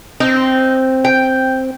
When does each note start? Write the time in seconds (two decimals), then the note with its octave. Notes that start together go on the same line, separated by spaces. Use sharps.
0.20 C4 D#4
1.05 G5